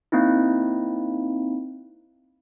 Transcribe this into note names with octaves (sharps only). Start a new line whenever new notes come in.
A#3 C4 D#4 E4